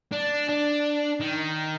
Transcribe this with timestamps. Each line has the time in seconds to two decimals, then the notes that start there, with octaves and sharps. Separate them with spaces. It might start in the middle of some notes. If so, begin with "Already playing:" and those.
0.12 D4
0.49 D4
1.21 D#3